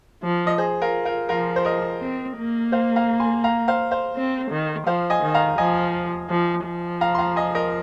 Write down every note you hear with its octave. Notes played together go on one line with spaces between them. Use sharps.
F3
D#5
G#4 C5
F4 A#4
F4 A#4
F3 F4 A#4
C5
A#4 D#5
C4
A#3
C5 F5
F5 A#5
G#5 C6
F5 A#5
C5 F5
C5 F5
C4
D#3
F3 C5 F5
D#5 G#5
D#3
F5 A#5
F3 D#5 G#5
F3
F3
F5 A#5
C6
F5 A#5
D#5 G#5
A#4 D#5